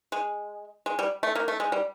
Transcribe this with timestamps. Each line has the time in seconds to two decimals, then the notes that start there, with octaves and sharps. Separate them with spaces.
0.12 G#3
0.86 G#3
0.99 G3
1.23 A3
1.35 A#3
1.48 A3
1.60 G#3
1.72 G3